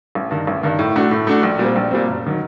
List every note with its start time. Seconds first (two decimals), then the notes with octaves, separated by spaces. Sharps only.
0.15 A1
0.31 G2 D#3
0.47 A1
0.63 G2 D#3
0.79 A2
0.96 A3 D4 F#4
1.11 A2
1.27 A3 D4 F#4
1.43 A#1
1.59 A#2 G3 C4
1.76 A#1
1.91 A#2 G3 C4
2.07 F#1
2.26 D#3 F#3